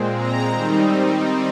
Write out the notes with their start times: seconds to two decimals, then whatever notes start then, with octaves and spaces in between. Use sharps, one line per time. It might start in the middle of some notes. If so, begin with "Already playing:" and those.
Already playing: A#2 G#3 C4
0.16 A#5
0.53 D#3 G3 C4 D#4